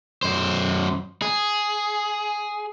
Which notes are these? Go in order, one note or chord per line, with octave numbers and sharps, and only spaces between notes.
F#2 C5
G#4